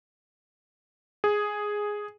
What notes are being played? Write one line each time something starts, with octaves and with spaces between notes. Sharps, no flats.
G#4